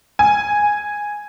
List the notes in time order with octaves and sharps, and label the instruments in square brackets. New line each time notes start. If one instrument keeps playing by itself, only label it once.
[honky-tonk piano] G#5